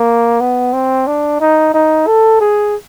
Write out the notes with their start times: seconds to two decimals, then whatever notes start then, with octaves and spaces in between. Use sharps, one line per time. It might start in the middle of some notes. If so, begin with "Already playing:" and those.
Already playing: A#3
0.40 B3
0.73 C4
1.07 D4
1.40 D#4
1.74 D#4
2.07 A4
2.41 G#4